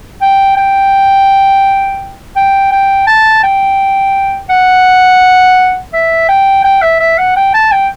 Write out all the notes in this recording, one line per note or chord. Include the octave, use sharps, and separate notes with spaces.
G5
G5
G5
G5
A5
G5
F#5
E5
G5
G5
E5
E5
F#5
G5
A5
G5